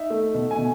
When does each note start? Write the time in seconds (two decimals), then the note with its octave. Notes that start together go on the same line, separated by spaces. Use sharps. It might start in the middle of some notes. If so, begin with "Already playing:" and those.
Already playing: D#4 E5
0.10 A3
0.35 B2
0.51 G#5
0.58 B2